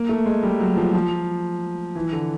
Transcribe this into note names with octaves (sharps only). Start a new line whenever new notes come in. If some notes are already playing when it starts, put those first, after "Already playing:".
Already playing: A#3
A3
G#3
G3
F#3
F3
F3
E3
D3